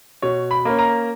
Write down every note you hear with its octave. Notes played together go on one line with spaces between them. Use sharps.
B2 C#5
B5
A#3 C#4
A#5